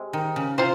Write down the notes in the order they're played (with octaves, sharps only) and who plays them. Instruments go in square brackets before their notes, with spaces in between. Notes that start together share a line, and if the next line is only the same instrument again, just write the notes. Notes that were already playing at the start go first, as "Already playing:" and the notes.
Already playing: [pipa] C3 G#3
[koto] D#3
C#3
[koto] C3 [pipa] F4 C5